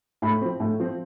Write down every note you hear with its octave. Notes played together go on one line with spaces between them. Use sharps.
A2 B5
F3 C4
A2
F3 C4